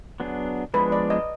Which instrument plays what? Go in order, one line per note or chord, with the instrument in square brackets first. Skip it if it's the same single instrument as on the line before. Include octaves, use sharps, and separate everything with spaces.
[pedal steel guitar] F#3 B3 D4 G#4
[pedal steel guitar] F3 G#3 B3 D4 G#4 [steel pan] B4
[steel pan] D5
D#5